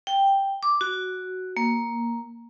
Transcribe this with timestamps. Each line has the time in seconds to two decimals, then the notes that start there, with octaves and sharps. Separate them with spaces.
0.07 G5
0.63 D6
0.81 F#4
1.57 A#3